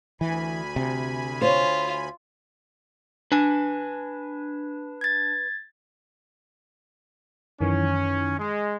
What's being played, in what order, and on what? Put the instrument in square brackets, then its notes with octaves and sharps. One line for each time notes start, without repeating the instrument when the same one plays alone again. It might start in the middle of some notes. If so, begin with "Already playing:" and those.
[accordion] D2 G#5 B5 [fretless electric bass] E3
[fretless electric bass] C3
[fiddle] F4 [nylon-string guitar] C5 C#5
[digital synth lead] D4 [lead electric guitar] B4 G#5
[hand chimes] G#6 A6
[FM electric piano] F#2 D#3 E3 [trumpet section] C#4
[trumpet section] G#3